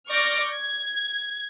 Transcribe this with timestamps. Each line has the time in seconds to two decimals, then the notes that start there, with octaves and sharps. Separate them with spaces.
0.11 D5 C#6 D6 F6 G6 A#6
0.53 G#6